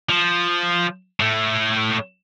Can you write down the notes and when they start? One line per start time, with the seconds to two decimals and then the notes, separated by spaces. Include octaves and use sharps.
0.09 F3
1.20 A2 A3